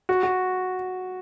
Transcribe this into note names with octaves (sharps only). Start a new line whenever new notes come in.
F#4
F#4